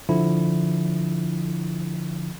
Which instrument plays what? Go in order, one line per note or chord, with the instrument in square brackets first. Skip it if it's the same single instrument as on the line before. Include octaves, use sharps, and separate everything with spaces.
[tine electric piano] D3 F3 E4